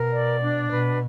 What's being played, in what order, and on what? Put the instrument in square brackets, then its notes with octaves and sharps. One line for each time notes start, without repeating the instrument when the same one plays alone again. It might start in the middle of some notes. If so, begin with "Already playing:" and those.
Already playing: [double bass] B2 [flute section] A#4
[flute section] D5
D4
[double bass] B2 [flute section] B4